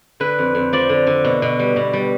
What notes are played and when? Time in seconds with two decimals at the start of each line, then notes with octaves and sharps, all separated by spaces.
0.20 D3 B4
0.39 F2
0.55 F2
0.73 F3 D5
0.89 D3
1.07 D3
1.24 B2
1.42 B2
1.59 G3
1.76 B2
1.93 G3